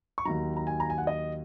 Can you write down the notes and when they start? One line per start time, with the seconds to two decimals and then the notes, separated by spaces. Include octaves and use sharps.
0.18 C#6
0.25 D#2 D#3 F#3 A#5
0.57 A#5
0.67 G#5
0.80 A#5
0.90 G#5
0.98 F#5
1.07 D#5